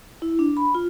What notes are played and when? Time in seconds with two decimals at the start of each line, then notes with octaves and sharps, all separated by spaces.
0.22 E4
0.39 D4
0.57 B5
0.75 F4